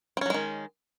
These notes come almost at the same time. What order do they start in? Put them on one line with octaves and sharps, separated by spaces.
C4 C#4 F#3 G#3 D#3